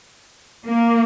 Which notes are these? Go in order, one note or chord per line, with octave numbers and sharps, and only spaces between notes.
A#3